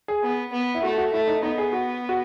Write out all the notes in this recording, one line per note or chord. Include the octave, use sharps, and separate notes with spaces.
G#4
B3
B3
E4
A3 F#4
F#4
A3 E4
D#4
B3 D#4
G#4
F#4
F#4